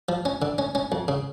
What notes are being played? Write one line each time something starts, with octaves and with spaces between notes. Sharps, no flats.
F3
C#4
D3
C#4
C#4
F2
C#3